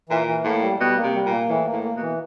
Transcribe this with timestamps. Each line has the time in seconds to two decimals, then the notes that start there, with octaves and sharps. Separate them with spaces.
0.09 A#2 E3
0.27 E3
0.44 A2 A#3
0.62 G3
0.80 B2 G3
0.97 A#3
1.03 C3
1.14 G3
1.26 A#2
1.32 A#3
1.49 A2 E3
1.67 A#3
1.73 A2
1.84 A#3
1.96 B2 E3